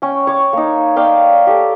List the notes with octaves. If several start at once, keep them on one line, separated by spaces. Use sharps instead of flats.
C#4 G5
C#5 D6
A#3 D#4
C#5 D5 F5 G5
G4 A4